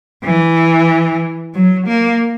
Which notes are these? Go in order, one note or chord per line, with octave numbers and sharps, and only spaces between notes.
E3
F#3
A#3